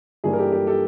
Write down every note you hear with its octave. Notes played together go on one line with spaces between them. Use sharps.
G2 E3 G3 A#3 G#4
A#4
G4 A4
G4 A4
G4 A4